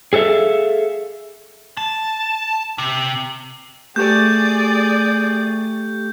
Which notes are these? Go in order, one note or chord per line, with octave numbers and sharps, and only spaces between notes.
G#4 A4 B4 E5 F5
A5
C3
A3 G4 G#4 D5 C#6 G6